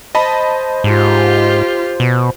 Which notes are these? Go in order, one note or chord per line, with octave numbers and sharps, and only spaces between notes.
C5 D#5 A5 B5
G#2 F4 G4
B2